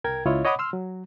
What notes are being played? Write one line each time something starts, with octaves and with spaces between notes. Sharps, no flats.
C2 A#4 G5 G#6
C#2 E4 F4 C#5 D#5
C#5 D#5 F#5 B5 D6 D#6
C6 E6 F6
F#3